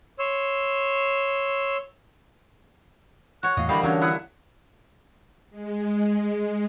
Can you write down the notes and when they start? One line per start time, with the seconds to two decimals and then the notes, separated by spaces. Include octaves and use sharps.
0.19 C#5 C6 E6
3.43 F#4 C#5 F#6
3.57 E2 A2 D#5 F5
3.69 D3 E3 G3 A#3 G4 D#5 F5 B5
3.83 D3 E3 F#3 C#4 D4 C#5
4.01 E4 F#5 D#6
5.50 G#3